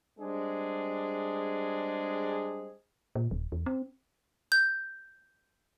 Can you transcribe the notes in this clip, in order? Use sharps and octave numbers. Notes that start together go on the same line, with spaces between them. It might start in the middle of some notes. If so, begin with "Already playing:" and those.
G3 G#3 C4 D4 G#4
A#2
D#1
E2
C4
G6